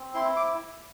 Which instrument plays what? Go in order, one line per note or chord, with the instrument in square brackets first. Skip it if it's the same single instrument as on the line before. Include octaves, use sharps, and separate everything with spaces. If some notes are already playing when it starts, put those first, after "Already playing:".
Already playing: [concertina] C4
E4 C6
D6